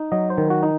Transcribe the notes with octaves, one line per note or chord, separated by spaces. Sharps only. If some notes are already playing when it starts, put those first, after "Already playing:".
Already playing: D#4
F#3 D#5
C5
D#3
F#4
D#4